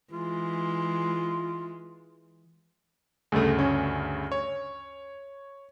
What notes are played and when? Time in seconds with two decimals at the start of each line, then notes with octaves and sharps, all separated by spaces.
0.11 E3 G#3 F4
3.32 D2 G2 C#3 G#3 A3
3.59 C#4
4.32 C#5